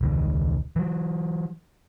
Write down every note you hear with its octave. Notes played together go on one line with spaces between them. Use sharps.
E1 C#2 D#3
E3 F#3